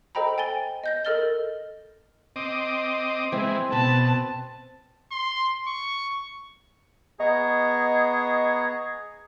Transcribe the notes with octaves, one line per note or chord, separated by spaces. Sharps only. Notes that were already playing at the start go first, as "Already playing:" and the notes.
A4 C5 D#5 G5 A#5 B5
G5 G#5 A6 G7
D#5 G6 A#6
A4 A#4 D#5 F6 A6 G7
C4 D#5 D6
E3 G#3 C4
B2 C4 A5 B5
C6
C#6
B3 G#4 D#5 A#5 C#6